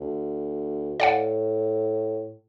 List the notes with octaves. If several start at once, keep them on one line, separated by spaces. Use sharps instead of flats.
D2
A2 D5 F5 F#5